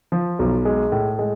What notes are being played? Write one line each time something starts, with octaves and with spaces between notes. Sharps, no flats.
F3
B1
G#3
A2
G#3